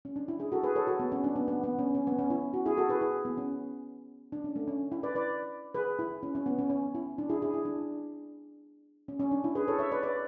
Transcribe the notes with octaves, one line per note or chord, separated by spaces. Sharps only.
C#4
D4
E4
E4 G#4
F#4 A4
G#4 B4
A4 C#5
F#4 A4
B3
C#4
D4
B3
B3
B3
C#4
C#4
B3
C#4
E4
F#4
E4 G#4
F#4 A4
G#4 B4
E4 G#4
B3
C#4
D4
C#4
A3
C#4
E4
B4 D5
B4 D5
G#4 B4
E4
C#4
C#4
B3
C#4
C#4
E4
D4
E4 G#4
E4 G#4
E4
D4
C#4
C#4
D4
E4
G#4 B4
A4 C#5
C#5 E5
B4 D5
B4 D5